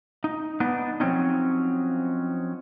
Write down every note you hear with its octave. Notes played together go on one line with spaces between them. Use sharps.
D#4
B3 D4 D#4 B4
F3 F#3 C4 C#4 D#4